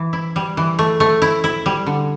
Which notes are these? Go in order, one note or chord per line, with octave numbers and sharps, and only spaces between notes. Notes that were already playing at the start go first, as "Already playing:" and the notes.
Already playing: E3
E4
G3
E3
A3
A3
E4
E4
G3
D3